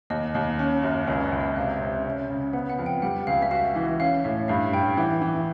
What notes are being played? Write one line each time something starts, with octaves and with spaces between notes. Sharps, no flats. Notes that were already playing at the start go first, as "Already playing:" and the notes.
D#2 D#5
D#2 D#5
C#4
F#2
C#2 D#5
D5
C#2
D#5
C3 F5
C3
C#4
C#3
B3 F#5
F#5
F2
G5
G3 F#5
C#2 F5
E5
F#4 F5
E3
C#4 F5
A2 E5
G2 F5
G2 G5
E3 F#5
E3